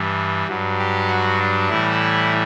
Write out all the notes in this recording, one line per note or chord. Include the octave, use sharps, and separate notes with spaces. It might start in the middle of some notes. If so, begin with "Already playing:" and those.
Already playing: G2 E3 G3
G2 F#3
G4
F#4
D4
A2 E3 G3 E4